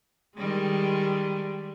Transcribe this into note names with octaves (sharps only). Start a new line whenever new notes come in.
D#3 G3 G#3